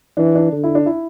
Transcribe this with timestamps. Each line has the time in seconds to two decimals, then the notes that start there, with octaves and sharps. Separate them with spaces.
0.17 E3 D4
0.35 D4
0.52 D3
0.64 E4
0.75 D4
0.86 E4